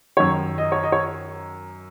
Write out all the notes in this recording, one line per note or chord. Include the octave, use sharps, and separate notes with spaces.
F#2 D#3 C#5
D#5
C#5
D#5
C#5